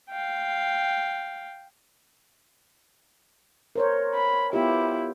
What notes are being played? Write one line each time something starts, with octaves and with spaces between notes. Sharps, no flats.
F5 G5
A#4 C5 C#5
B5
B3 E4 F4 G4